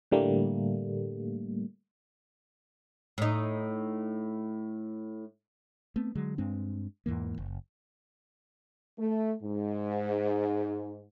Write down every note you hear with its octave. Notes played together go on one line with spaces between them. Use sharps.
A2 D3 G3 A3 A#3
A2 D#4
A3 B3 C4
D3 F#3 G#3
G2 G#3 C4 D4
E2 G#2 E3 A#3
F#1
A3
G#2